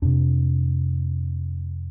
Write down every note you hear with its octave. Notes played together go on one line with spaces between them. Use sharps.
F2 C3 D4